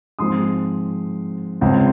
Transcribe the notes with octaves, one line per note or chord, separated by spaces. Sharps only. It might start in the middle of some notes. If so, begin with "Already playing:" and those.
G#2 F3 G#3 C4 C6 D#6
C#2 C#3 G#3 C4